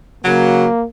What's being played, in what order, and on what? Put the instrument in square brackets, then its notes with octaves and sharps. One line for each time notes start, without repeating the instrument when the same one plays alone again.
[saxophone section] C#3 F#3 [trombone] A#3